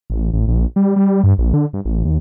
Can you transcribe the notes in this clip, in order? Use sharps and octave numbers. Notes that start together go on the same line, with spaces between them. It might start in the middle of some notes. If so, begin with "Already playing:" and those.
A1
A1
A#1
G3
G3
G2
A#1
D3
G2
A1
D#2